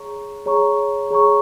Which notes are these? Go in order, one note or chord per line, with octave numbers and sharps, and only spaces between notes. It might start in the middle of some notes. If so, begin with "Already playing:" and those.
Already playing: G#4 C#5 A#5 C#6
G#4 C#5 A#5 C#6
G#4 C#5 A#5 C#6